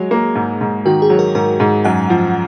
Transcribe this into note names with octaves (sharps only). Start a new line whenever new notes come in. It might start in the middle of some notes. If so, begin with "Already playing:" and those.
Already playing: F#3 G#3 G#4
A#3
G#2
G#2
D#3 F#4
G#4
F#3
A#4
G#2 A#4
G#2
F#2 F#5
F3